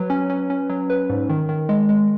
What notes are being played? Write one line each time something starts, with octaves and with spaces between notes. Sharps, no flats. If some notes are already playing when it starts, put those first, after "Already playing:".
Already playing: F#3 B4
C#4
C#4
C#4
F#3
B4
G#2
D#3
D#3
G#3
G#3